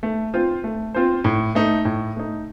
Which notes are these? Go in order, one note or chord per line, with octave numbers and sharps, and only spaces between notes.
A3
C4 F4 C5
A3
C4 F4 C5
A2
A3 D#4
A2
A3 D#4